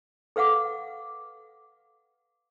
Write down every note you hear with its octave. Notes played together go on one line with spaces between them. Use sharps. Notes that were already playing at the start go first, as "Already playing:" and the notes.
A4 B4 F5 F#5 D6